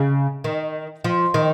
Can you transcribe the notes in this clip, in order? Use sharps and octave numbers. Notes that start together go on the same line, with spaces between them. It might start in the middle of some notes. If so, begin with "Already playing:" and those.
Already playing: C#3
D#3
F3
D#3